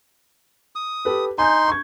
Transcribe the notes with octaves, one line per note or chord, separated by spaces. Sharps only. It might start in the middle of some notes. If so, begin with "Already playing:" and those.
D#6
G4 A4 B4
D#4 G#5 C6 G6
C#6 G#6